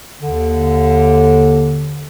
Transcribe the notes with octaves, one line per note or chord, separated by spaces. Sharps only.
D#2 D3